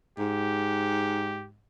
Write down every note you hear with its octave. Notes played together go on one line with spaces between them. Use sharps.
G#2 G4